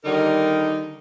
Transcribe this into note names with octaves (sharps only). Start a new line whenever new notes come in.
D3 D#3 G3 D#4 A#4